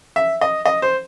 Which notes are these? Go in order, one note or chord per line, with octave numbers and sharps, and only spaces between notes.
E5
D#5
D#5
C5